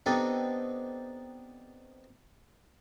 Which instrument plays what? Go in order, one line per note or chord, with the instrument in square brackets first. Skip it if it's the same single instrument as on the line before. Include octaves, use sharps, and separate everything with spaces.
[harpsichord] B3 C4 D4 D#4 G4 A4